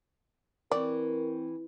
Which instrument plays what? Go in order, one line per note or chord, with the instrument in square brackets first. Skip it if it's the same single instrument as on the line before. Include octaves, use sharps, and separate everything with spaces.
[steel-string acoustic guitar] E3 [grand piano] C4 G5 C#6 [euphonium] A#4 [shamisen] D5